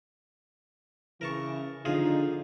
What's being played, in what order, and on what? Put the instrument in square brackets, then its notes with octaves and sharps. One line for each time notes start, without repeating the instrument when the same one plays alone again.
[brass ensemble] C#3 E3 [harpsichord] A#4 A5 C#6
[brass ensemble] D3 D#4 [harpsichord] F3 F4 G#4